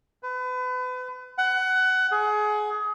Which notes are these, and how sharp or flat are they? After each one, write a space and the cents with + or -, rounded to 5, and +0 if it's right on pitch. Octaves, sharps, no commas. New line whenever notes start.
B4 +35
F#5 +20
G#4 +25